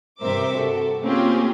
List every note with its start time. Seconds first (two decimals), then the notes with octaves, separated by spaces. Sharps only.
0.21 G2 C3 A#4 C5 E5 D6
0.56 F#4 A4
1.03 A#3 C4 C#4 F4 G4 G#4